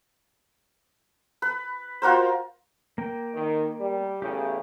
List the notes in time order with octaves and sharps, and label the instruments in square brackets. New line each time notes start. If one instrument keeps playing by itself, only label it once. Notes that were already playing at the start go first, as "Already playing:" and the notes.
[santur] B4
F4 F#4 A#4 C5
[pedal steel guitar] A#3 G5
[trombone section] D#3
G3
[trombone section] E2 A2 C#3 [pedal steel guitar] G4